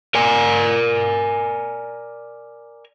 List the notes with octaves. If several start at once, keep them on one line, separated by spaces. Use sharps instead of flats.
A#4 D5 G#5